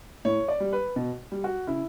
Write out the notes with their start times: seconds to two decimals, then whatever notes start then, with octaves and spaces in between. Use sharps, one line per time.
0.25 A2 C#5
0.48 D5
0.60 G3
0.73 B4
0.96 B2
1.32 G3
1.44 F#4
1.67 C#3 E4